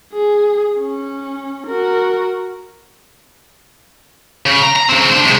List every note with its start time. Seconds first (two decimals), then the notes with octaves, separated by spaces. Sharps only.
0.14 G#4
0.79 C#4
1.67 F#4 A#4
4.46 C#3
4.62 A#5
4.76 A#5
4.89 C#3 C4
5.12 D4 C5
5.26 C3 G#3